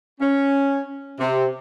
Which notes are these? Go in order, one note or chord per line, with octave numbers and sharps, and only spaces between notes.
C#4
C3